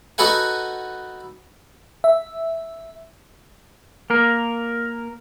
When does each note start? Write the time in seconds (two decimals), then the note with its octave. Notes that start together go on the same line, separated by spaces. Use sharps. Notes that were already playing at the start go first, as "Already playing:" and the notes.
0.18 D#4 F#4 A4 B4 F#5 G#5
2.04 E5
4.10 A#3 A#4